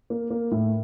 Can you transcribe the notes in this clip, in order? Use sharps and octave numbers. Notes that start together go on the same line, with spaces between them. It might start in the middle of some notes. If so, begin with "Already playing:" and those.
A#3
A#3
A2